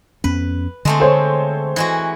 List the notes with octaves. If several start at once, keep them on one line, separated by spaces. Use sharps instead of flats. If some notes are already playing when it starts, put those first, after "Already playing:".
F2 B3 C#4 B4
D3 G#3 A3 C4
A4 C5 C#5
E3 G#3 F#4